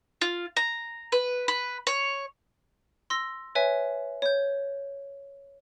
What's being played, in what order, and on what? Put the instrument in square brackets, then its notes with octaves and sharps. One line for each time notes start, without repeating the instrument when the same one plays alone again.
[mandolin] F4
A#5
B4
B4
C#5
[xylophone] C6 E6 A#6
B4 C#5 E5 G#5
C#5 G6